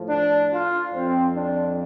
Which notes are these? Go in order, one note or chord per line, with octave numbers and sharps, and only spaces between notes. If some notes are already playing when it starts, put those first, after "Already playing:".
Already playing: A2 F3
D4
F4
F2 F3 C4
D4